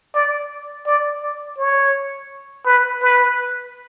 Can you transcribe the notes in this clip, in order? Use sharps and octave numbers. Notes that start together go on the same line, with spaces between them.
D5
D5
D5
C#5
B4
B4